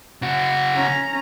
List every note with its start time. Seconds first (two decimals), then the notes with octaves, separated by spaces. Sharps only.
0.22 C#3 F#4
0.75 C#4 A#5